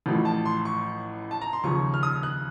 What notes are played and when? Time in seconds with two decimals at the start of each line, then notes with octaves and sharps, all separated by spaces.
0.06 A1 A2 F3
0.25 A5
0.45 C6
0.65 C#6
1.31 A5
1.41 A#5
1.53 C6
1.63 D#2 C#3 F3 C#6
1.94 F6
2.03 D#6
2.23 F#6